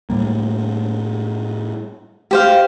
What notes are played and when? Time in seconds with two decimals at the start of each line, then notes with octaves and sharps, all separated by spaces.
0.10 A2 G3 A#3
2.31 G4 C5 F5